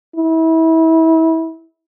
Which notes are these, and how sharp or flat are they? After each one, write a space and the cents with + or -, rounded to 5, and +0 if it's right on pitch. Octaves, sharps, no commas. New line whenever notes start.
E4 -30